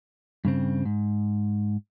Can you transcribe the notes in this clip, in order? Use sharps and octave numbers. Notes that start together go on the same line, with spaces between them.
G2 C#3 C4
G#2